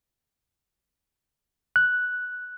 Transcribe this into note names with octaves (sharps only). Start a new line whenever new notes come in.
F#6